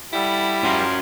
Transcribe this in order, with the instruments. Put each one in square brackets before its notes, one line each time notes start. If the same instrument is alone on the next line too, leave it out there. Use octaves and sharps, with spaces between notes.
[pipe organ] G3 [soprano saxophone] E4 [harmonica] A4 F#5
[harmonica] F3 A#4 C6 [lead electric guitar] C#4 F#4